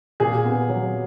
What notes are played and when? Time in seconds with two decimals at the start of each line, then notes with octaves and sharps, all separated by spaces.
0.20 A#2 G#4
0.44 B3
0.69 F#3